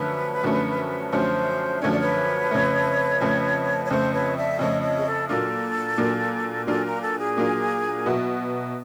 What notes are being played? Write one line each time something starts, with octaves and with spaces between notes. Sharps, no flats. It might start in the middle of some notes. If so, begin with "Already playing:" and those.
Already playing: F#2 D3 F3 A3 C#4 B4
F#2 D3 F3 A3 C#4
F#2 D3 F3 A3 C#4 C5
F#2 D3 F3 A3 C#4 C#5
D5
B4 C#5
F2 C#3 F3 A3
F2 C#3 F3 A3
C#5
F2 C#3 F3 A3 C5
B4 C#5
D5 E5
F2 C#3 F3 A3 C#5 D#5
C#5 D#5
G#4
A4
A#2 F#3 A#3 D4 F4 A4
A#2 F#3 A#3 D4 F4
A#2 F#3 A#3 D4 F4 A4
A#4
A4
G#4
A#2 F#3 A#3 D4 F4
B2 F#3 B3 E4